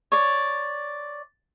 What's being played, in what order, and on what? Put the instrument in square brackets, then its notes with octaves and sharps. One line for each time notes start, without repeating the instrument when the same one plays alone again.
[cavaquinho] C#5 D5